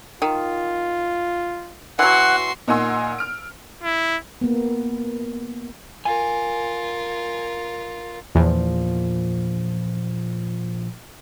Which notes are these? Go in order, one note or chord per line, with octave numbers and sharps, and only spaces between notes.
D#3 F4
E3 F#3 F#4 F#5 C6
A#2 D#4 F#5 G#5 C6 E6
F6 D7
E4
A#3 B3
F4 A#4 G#5
E2 A#2 F3